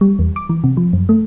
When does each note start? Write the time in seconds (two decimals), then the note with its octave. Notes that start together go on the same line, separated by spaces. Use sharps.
0.01 G3
0.19 E2
0.36 D6
0.49 E3
0.64 C3
0.77 F3
0.93 F#2
1.09 A3